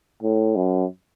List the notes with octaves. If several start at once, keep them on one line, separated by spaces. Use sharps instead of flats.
A2
F#2